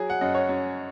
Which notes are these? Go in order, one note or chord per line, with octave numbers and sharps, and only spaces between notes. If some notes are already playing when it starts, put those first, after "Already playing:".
Already playing: F#3 G#4
F#5
F#2 D#5
C#5
F#2